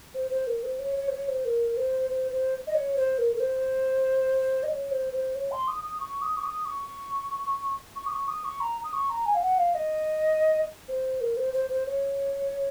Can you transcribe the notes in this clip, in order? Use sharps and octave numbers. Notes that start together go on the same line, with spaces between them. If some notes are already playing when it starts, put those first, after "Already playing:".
C5
C5
A#4
C5
C#5
C#5
C5
C#5
C5
A#4
C5
C5
C5
D#5
C#5
C5
A#4
A#4
C5
D#5
C#5
C5
C5
C#5
C6
D#6
D#6
C#6
D#6
C#6
D#6
C#6
C#6
D#6
C#6
D#6
C#6
A#5
D#6
C#6
A#5
G#5
F5
F#5
F5
D#5
C5
A#4
C5
C5
C5
C#5